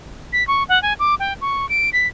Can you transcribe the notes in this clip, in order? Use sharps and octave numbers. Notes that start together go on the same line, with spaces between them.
B6
C#6
F#5
G#5
D6
G5
C#6
D7
B6